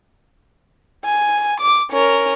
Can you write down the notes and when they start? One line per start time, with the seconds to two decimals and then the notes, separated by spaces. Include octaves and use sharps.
1.05 G#5
1.61 D6
1.91 C#4 A#4